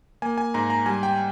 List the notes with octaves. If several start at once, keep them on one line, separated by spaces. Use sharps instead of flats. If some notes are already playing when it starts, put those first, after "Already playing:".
A#3 G#5
G#5
G#2 A#5
A#5
G3 G#5
G5